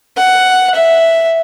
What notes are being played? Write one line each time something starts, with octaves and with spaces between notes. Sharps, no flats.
F#5
E5